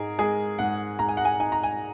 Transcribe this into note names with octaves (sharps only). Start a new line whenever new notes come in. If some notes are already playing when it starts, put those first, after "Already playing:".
Already playing: G#2 D#4 G#4 A#4
G#3 G#4
G#2 F#5
G#2 A#5
G#5
F#5
G#5
D#4 G#5
A#5
G#5